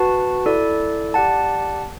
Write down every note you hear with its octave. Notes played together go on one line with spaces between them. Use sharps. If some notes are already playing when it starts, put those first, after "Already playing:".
Already playing: F#4 B4 F#5 A5
E4 A4 D5
G4 D5 F#5 A5